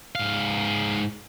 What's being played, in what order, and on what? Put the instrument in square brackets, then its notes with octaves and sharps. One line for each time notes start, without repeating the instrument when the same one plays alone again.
[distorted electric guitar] G#2 F5